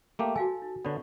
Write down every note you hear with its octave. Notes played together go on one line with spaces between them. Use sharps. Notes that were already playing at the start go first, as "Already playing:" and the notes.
A3 A#3 G4
F#4 A4 F5 G#5
D#4
D3 B3 C#5 D5 C#6